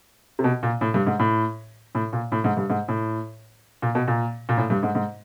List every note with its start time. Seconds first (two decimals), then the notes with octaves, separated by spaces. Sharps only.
0.39 C3
0.44 B2
0.63 A#2
0.81 A2
0.94 G2
1.07 G#2
1.19 A2
1.95 A2
2.13 A#2
2.32 A2
2.44 G#2
2.57 G2
2.70 G#2
2.88 A2
3.82 A#2
3.95 B2
4.08 A#2
4.49 A#2
4.57 A2
4.70 G2
4.83 G#2
4.95 G#2